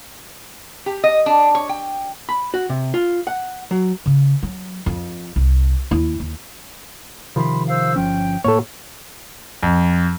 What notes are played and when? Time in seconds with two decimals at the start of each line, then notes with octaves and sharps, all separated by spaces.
0.86 G4
1.04 D#5
1.26 D4
1.55 C#5
1.69 G5
2.29 B5
2.54 F#4
2.69 C3
2.94 F4
3.27 F#5
3.71 F#3
4.06 C#3
4.43 F#3
4.86 F2
5.36 C2
5.91 D#2 E4
6.20 D#2
7.36 C3 D#3 F3 B5 C6
7.68 C5 F5 E6
7.96 G1 F3 C#4 G5
8.44 A2 A#3 A4 C#5
9.63 F2